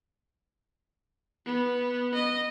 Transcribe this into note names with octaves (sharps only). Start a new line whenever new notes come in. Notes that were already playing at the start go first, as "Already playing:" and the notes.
B3
D#5